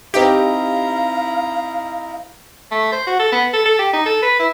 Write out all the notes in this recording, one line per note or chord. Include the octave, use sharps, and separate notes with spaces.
C4 D#4 E4 G4 F5 A#5 D7
A3
C5
F#4
A4
B3
A4
A4
G4
D#4
A4
B4
E4